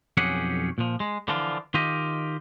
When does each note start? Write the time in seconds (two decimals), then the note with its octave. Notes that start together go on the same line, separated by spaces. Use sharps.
0.17 B1 F2 C#4 G4 G#4 F#5
0.78 A#2 F3
1.00 G#3
1.28 D3 E3 F3 D4 F4
1.74 D#3 F4 G4 D#5